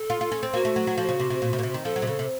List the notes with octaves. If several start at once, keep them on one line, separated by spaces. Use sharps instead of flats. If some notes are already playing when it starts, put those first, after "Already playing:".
Already playing: A4
F4
F4
C#4
C4
A#3 F#4
A3
F#3
F#3
F3
C#3
C3
C3
A#2
C3
A#2
C3
D#3
F3 A4
F#3
C3
C#3 A4
C3